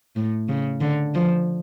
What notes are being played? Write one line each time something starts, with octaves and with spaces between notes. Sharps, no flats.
A2
C#3
D3
F3